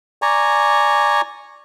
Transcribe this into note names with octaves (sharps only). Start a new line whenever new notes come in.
D5 G#5 A#5 C#6